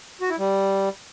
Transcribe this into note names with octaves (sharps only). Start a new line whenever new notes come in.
F#4
E4
G3